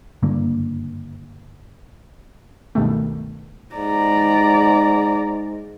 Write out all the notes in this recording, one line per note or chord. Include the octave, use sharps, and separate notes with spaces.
F#1 G2 D3 A#3
C#2 G2 B2 D#3 G3 A3
G#2 D5 A#5